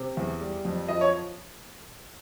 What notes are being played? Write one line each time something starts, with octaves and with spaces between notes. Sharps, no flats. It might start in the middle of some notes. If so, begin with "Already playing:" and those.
Already playing: C3
E2
G3
F2
F3 D#5
C#5